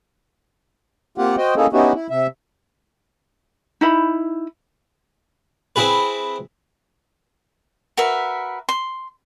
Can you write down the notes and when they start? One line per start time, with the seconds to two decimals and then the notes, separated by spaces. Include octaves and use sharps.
1.18 A#3 C4 F4 G4 F#5
1.37 F#4 C5 D#5 G5
1.56 A#3 C#4 D#4 E4 G#4 A4
1.73 B3 C#4 D#4 E4 F#4 G4
1.95 E4
2.10 C3 E5
3.81 D#4 E4 B5
5.76 C4 E4 G#4 B4
7.97 F#4 A#4 B4 E5
8.69 C6